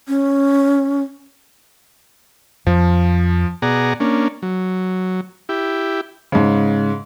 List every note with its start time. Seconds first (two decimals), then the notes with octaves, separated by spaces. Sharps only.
0.08 C#4
2.67 F2 F3
3.62 B2 G#4 D5 F#5 A#5
4.00 A#3 C#4 D4
4.42 F#3
5.49 E4 G4
6.32 G#2 C#3